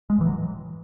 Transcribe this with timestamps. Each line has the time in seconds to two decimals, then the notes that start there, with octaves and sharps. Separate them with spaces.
0.10 G#3
0.18 A2 E3
0.26 F#3